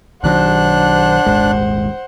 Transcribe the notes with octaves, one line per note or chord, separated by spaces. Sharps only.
B1 D#3 F#3 D4 C5 F#5 F#6
D#1 G#1 G#3